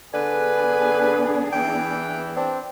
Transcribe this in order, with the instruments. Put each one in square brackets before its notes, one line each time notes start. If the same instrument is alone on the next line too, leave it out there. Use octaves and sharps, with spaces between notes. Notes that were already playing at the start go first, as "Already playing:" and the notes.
[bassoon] D3 [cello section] B3 D4 G#4 [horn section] B4 [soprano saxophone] G#5
[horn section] E3 [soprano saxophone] G5
[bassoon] C4 [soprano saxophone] D4